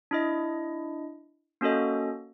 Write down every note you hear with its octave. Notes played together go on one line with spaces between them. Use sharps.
D4 E4 D#5
A#3 C#4 F#4 A4 D#5